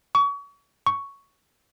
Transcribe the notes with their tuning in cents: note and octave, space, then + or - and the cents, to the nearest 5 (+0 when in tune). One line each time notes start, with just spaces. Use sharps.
C#6 +35
C#6 +5